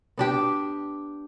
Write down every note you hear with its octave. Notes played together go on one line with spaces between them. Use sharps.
B3 D4 G4